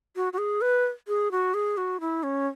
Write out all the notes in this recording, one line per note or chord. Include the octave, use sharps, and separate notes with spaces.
F#4
F#4
G#4
B4
G#4
F#4
G#4
F#4
E4
C#4